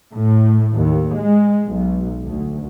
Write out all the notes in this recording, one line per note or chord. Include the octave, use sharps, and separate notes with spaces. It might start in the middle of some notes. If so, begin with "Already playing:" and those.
A2
D#2
G#3
B1
D2